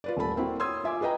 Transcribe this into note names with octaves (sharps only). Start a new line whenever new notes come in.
F4 B4 D5
D#1 A3 A4 B5
A#3 C4 E4 F#4
C#5 C6 D#6 E6 G#6
F4 E5 G#5 D6
G#4 B4 D#5 G5 A#5